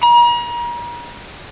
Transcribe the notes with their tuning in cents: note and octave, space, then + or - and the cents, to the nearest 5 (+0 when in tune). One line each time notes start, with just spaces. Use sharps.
A#5 +40